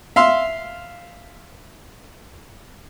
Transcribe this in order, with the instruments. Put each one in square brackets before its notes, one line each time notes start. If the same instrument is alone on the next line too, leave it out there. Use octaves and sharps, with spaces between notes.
[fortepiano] E5 F5 C6